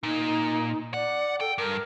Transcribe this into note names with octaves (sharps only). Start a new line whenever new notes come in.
A#2 D#4
D5 F#5
A4 G5
G2 A#4